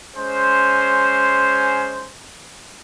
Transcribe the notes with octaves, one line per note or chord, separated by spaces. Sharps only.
G#3 C#4 C5